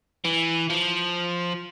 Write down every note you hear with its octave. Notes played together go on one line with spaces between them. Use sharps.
E3
F3